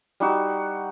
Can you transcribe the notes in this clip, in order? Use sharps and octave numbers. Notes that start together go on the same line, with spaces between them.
G3 D#4 F#4